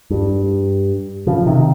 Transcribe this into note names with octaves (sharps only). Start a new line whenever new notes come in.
G2
C#3 F3
C3 D#3